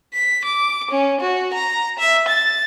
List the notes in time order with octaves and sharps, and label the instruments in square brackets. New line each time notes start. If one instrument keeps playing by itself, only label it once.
[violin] B6
D6
C#4
F#4
A#5
E5
A6